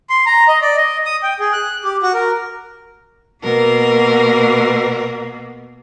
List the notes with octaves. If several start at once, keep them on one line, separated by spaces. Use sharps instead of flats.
C6
A#5
D#5
D5
D#5
D#6
G5
G#4
F#6
G4
F#4
A#4
B2 A#3 A#4